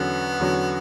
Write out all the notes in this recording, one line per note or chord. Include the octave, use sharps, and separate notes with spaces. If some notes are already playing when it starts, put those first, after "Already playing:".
Already playing: E2 D3 F#3 B3 C#4 F#4
E2 D3 F#3 C#4 F#4